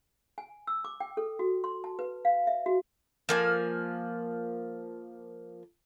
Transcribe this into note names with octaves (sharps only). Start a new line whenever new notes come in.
G#5
E6
D6
G5
A4
F#4
C6
A5
B4
F5
E5
F#4
F3 A#3 G#5